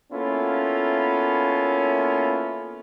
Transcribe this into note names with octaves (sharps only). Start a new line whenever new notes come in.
A#3 B3 C#4 E4 F4 A4